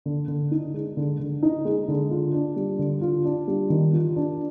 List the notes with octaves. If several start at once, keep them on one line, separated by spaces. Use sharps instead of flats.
D3
D3
D#4
G#3
D3
D3
D#4
G#3
D3
F4
D4
G3
D3
F4
D4
G3
D#3
F4
D4